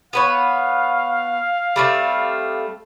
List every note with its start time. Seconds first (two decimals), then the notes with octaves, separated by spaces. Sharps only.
0.13 B3 B4 C#5 F5
1.76 G3 A3 C4